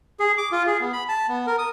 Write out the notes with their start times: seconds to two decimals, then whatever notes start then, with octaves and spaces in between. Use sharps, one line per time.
0.20 G#4
0.38 D6
0.52 F4
0.67 G#4
0.81 B3
0.93 B5
1.08 A5
1.29 B3
1.47 A#4
1.59 D#6